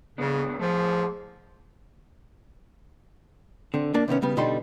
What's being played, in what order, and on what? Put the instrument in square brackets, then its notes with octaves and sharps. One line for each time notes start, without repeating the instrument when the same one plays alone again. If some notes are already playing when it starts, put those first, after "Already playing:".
[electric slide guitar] G#2 B3 D4 [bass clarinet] C#3
[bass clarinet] F3 [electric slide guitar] A3 G#4 C5
[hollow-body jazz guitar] D3 C4
A#3 D4 A5
C3 D#3 B3 C#4
C#3 G3 B3
B2 D3 G3 D#4 A5 C6